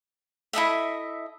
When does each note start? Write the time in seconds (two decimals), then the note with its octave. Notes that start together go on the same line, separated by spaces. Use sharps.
0.53 E4 A4 D#5 E5